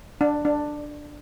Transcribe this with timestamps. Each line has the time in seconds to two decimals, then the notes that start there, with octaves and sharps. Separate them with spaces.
0.21 D4
0.45 D4